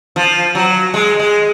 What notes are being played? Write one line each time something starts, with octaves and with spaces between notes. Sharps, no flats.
F3
F#3
G#3
G#3